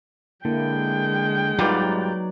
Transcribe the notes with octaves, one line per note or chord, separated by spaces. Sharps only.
D3 G#3 A#3 E4 G5
G#2 F#3 G3 D#4 F4 B4 D5